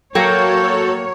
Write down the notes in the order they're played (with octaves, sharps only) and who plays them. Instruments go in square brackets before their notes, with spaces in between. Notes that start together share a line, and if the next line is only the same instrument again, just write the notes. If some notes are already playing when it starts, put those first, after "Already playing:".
[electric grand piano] F#3 [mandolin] A#3 G5 A#5 [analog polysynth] F#4 A4 [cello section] C#5